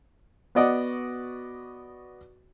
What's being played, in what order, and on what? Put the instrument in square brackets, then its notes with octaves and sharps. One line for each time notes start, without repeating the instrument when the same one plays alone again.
[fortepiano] B3 F#4 D5 D#5 F#5